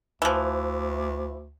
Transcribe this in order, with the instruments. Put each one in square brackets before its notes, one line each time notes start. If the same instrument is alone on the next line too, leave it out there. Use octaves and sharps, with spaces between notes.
[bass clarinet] D2 [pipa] E3 F3